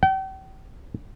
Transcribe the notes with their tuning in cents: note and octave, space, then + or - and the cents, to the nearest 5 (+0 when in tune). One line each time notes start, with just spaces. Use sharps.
G5 -40